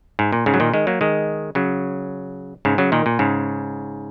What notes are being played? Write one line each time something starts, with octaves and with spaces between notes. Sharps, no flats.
G#2
A#2
G#2 C#3
F#3
A#2 D#3
D#3 G#3
F#3 A#3
D#3 G#3
C#3 F#3
G#2 C#3
C#3 F#3
A#2 D#3
A#2
G#2 C#3